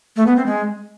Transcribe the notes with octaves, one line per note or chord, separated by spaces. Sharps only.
A3
B3
C4
G#3